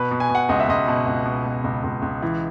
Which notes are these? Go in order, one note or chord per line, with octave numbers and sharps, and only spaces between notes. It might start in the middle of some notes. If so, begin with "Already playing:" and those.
Already playing: B2 B4
B2
G#5
B2
F#5
C#2 D#5
E5
C#2 D#5
B2
C#2
B2
B2
C#2
C#2
C#2
E3